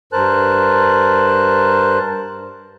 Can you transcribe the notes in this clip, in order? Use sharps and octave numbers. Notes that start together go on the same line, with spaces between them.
G2 A#4 C5 A5 F#6